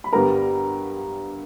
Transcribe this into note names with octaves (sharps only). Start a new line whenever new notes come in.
B5
G2 D3 G3 B3 A#4 A#5